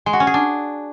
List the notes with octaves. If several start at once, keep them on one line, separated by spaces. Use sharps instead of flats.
G#3
F#4
C#4
G#4
D4